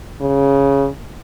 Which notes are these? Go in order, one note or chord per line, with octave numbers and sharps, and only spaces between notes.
C#3